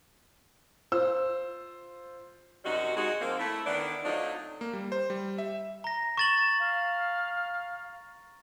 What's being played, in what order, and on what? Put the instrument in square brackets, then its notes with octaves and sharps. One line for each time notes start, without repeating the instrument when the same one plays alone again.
[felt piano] F4 C5 E6
[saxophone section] F#2 C3 G3 D#4 F#4
G#3 D#4 F#4
F3 A#3 C4
A3 E4
D#3 E3 A3 B3 D4
F#3 A3 C4 D4 D#4 F4
[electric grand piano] A#3
G3
C5
G3
E5
[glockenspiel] A#5 A#6
[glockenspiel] C#6 A6 F#7 [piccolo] E7
[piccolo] F5